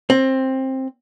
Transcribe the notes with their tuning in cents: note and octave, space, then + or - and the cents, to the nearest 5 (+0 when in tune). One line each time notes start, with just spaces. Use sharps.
C4 +15